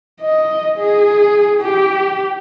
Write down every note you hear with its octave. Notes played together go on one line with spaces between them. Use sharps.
D#5
G#4
G4